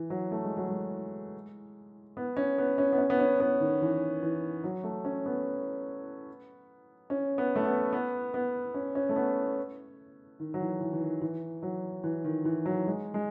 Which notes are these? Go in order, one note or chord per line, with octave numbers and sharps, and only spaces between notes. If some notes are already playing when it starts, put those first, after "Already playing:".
Already playing: E3
F#3
A3
G#3
F#3
G#3
B3
C#4
B3
C#4
B3
C#4
B3
C#4
B3
D#3
E3
E3
F#3
A3
C#4
B3
C#4
B3
A3
B3
B3
B3
C#4
C#4
A3
B3
D#3
F#3
E3
E3
E3
D#3
E3
F#3
E3
D#3
E3
F#3
G#3
G#3